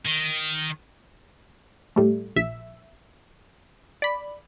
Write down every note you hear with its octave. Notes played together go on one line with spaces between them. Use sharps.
D#3
A2 G3 A3
A#1 E5
D5 B5